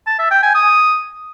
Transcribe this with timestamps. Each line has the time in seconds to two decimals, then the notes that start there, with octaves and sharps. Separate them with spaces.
0.07 A5
0.19 E5
0.31 G5
0.43 G#5
0.55 D#6